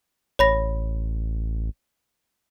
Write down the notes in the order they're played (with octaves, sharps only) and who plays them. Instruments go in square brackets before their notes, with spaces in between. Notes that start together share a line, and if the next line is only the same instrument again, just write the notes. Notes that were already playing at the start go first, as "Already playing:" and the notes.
[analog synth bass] A1 [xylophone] C#5 B5 A#6